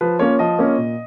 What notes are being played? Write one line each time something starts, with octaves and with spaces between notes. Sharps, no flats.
F3 B4
A#3 C#4 F4 C#5
F3 D#5
A#3 C#4 F4
A#2